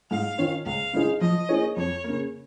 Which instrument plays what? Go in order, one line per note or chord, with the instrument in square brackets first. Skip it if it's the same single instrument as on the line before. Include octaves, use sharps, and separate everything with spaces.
[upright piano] G#2 [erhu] F5
[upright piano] D#3 C#4 F4 C#5
[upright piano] C#2 [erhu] F5
[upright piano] C#3 G#3 D#4 G#4
[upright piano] F3 [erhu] D#5
[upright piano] A#3 D#4 G#4 C#5
[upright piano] F2 [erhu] C#5
[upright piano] C#3 A#3